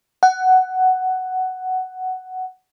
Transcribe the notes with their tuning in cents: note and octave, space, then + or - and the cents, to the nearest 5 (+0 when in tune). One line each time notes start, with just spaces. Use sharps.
F#5 +10